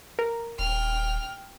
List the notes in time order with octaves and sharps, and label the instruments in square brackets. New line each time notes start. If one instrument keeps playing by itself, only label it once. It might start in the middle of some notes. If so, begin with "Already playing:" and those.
[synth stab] A#4
[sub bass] D#1 [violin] G5 F6